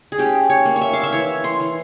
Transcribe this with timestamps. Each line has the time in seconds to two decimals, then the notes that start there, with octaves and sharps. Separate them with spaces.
0.12 G#4
0.18 C#4 G4
0.50 C#5
0.65 A#3
0.76 C#5
0.81 E5
0.93 F5
1.03 E5
1.12 E3 C#5
1.44 C6
1.60 E3